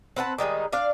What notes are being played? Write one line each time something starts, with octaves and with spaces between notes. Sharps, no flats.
C4 B4 F#5 A5
D#3 G3 G#3 D#4
D4 D5 F5